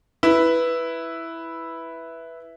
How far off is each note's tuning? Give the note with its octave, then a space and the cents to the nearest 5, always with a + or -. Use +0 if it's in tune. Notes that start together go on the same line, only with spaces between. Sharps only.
E4 +0 B4 +0